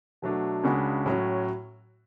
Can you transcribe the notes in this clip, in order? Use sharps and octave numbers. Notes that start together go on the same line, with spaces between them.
B2 F#3 A3 D4
C#2 C#3 G#3 D4 F#4
A2 F#3 C#4